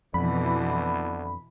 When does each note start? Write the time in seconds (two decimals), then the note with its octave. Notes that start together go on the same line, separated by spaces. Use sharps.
0.14 F2 B2 D3 E3 B5